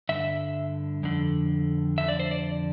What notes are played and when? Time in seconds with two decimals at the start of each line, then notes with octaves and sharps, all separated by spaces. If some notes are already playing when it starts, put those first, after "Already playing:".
0.09 G2 D3 E5
1.03 F2 D3
1.98 F2 D3 E5
2.08 D5
2.20 C5
2.31 D5